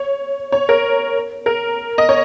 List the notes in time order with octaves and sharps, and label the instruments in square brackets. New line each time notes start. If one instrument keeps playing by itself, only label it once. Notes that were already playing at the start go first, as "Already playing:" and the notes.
Already playing: [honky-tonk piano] C#5
C#5
A#4
A#4
D#5
C#5